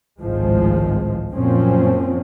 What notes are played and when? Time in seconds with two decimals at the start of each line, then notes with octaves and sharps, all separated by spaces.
0.20 G#1 C#2 A2 D#3 F3 G#3
1.32 F#2 A#2 F3 C4 C#4